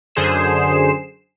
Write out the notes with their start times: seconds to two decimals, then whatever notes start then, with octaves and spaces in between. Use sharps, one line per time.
0.16 F#2 D3 G#4 C5 C7 E7